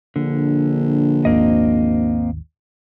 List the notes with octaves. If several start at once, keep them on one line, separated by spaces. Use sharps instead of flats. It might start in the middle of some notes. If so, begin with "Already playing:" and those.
A#1 D3
G#1 D#2 A#3 C4 D#5